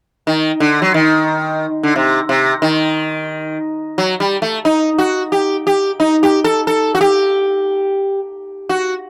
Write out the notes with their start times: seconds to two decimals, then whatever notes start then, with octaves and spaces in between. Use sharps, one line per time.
0.27 D#3
0.60 D3
0.82 F#3
0.94 D#3
1.83 D3
1.96 C3
2.29 C3
2.62 D#3
3.98 F#3
4.20 G3
4.42 A3
4.65 D#4
4.98 F#4
5.32 G4
5.67 G4
6.00 D#4
6.23 G4
6.44 A4
6.67 A4
6.95 F#4
7.01 G4
8.69 F#4